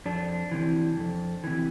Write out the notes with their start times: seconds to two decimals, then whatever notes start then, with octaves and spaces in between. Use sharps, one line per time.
0.06 F2 D4
0.51 C3 E3
0.97 F2
1.44 C3 E3